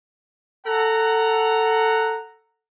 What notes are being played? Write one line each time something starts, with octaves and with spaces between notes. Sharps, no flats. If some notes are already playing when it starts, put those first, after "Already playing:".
A4 F#5 A#5